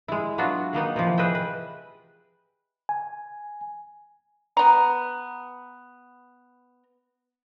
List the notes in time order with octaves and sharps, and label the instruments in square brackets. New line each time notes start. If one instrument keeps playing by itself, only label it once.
[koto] G#3 E4
F#3 B3 D4 F4 F#4
D#3 A#3 B3 D#4
C3 E3 F3
G#4 B4 D#5 E5 G5
B4
[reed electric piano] G#5
[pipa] B3 A#5